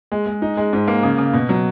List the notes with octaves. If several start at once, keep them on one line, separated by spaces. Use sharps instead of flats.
G#3
G#3
D#4
G#3
G#2
A#3
C#3
C#3
B2
F#3